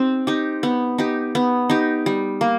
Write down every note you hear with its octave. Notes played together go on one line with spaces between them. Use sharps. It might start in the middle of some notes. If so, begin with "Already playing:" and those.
Already playing: C4 D#4 G4
D#4 G4
B3
D#4 G4
B3
D#4 G4
G3
A#3